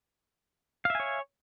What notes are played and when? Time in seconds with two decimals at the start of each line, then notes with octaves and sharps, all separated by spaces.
0.85 F5
0.90 E5
0.95 G#5
1.00 C#5